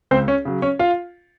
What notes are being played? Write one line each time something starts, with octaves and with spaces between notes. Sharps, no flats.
C#2 C4 C5
C#4 C#5
C#3 F#3
C#4 C#5
F4 F5